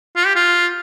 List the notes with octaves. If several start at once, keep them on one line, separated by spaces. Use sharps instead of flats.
F4
G4
F4